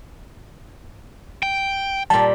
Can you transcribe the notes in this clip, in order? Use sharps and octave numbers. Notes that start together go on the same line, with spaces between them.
G5
A#2 G3 A5